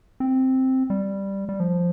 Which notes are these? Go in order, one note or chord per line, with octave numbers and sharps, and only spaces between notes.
C4
G3
G3
F3